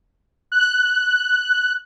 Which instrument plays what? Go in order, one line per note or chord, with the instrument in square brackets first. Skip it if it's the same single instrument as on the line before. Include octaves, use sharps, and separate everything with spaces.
[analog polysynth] F#6